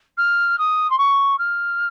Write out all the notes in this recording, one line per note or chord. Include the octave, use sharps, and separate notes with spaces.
F6
D#6
C6
C#6
F6